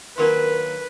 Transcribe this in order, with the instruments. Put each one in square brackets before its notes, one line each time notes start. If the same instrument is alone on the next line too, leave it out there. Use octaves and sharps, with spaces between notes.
[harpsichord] D#3 F#3 A#3 [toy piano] D4 A#4 C6 [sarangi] B4